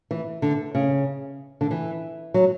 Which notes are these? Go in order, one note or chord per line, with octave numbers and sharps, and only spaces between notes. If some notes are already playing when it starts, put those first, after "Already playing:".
E3
D3
C#3
D3
E3
F#3